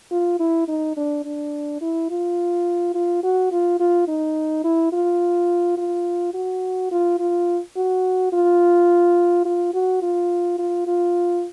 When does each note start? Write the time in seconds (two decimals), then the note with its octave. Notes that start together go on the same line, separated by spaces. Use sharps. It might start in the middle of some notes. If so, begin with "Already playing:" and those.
0.11 F4
0.40 E4
0.68 D#4
0.97 D4
1.25 D4
1.81 E4
2.10 F4
2.95 F4
3.23 F#4
3.52 F4
3.80 F4
4.08 D#4
4.64 E4
4.93 F4
5.78 F4
6.34 F#4
6.91 F4
7.19 F4
7.76 F#4
8.33 F4
9.45 F4
9.74 F#4
10.02 F4
10.59 F4
10.87 F4